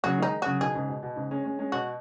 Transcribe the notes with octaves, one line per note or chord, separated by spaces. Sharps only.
C#3 F#3 F#4
D#3 G#3 D#4
C#3 F#3 F#4
B2 D#3 G#4
G#2 C#3
B2
B2
G#2 C#3
G#3 C#4
G#3 C#4
G#3 C#4
B2 F#4